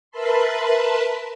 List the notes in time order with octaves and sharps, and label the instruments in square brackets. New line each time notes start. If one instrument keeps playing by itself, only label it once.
[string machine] A#4 B4 E5 A5 B5 C6